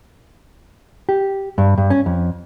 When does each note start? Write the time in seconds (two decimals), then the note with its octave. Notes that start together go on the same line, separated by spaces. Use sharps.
1.09 G4
1.58 G2
1.78 G2
1.90 C#4
2.06 F2